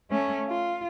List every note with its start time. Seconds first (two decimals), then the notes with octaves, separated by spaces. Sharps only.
0.10 A3 C#4
0.48 F4